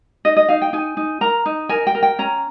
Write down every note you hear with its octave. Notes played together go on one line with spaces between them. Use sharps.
D#4 D#5
D#5
D#4 F5
G5
D#4 G#5
D#4
A#4 A#5
D#4
A#4 G#5
G5
A#4
G5
C#4 A#5